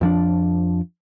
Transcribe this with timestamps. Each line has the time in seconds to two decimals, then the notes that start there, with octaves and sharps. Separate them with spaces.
0.01 F2 F3 D4